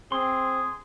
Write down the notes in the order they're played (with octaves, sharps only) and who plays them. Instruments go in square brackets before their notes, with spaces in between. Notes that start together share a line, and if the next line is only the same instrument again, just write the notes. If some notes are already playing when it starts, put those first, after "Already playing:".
[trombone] C4 [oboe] G#4 [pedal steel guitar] C6